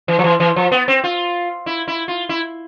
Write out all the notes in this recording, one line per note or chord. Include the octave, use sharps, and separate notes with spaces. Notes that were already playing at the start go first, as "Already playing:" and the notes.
E3
F3
E3
E3
F3
B3
C4
F4
E4
E4
F4
E4